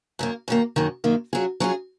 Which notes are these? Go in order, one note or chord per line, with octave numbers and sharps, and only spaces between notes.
F#2 D#3 A#3
F#2 D#3 A#3
F#2 D#3 A#3
F#2 D#3 A#3
F#3 C#4 F4 G#4
F#3 C#4 F4 G#4